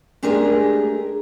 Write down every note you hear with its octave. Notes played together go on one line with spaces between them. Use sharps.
G#3 A3 D4 G4 G#4 A#4